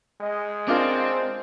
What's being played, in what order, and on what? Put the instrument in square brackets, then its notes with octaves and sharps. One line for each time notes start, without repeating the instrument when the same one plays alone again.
[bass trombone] G#3 [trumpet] D#5
[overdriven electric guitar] C4 [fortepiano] D4 F4 A#4 [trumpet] C5